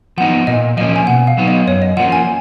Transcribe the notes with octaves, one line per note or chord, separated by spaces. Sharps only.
F3 B3 D#4 F#5
A#2 D#5
F3 A#3 C#4 D#5
G#5
B2 F#5
F5
F#3 B3 D#4
D#5
F#2 C#5
D#5
F3 A#3 C#4 F#5
G#5